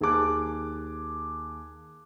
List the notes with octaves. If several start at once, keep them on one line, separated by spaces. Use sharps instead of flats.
D#2 G#4 A5 D6 F#6